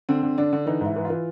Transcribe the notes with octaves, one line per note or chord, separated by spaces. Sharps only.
D3 C4
D3
D3 D4
D3
E3 D#4
G#2
E4
E3
F4
E3